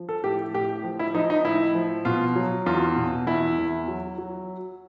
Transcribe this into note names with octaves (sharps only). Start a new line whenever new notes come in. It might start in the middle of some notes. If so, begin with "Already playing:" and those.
Already playing: F3
A4
A2 G4
A2 G4
F3
E4
F3 D#4
D#4
A2 E4
F3
B2 F4
F#3
E2 F4
B2
E2 E4
E2
F#3
F#3